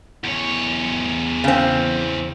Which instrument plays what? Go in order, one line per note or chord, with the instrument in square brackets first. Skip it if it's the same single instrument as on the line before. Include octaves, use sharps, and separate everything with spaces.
[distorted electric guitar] E2 C#5
[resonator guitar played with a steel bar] C#3 C4